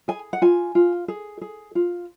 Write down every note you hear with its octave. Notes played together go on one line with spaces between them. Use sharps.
G#4 G#5
F#5
F4 G#5
F4
G#4
G#4
F4